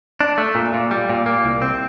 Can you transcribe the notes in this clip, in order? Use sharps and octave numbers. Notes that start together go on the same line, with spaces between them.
D4
A3
A#2
A#2
G3
A#2
A#3
C2
C4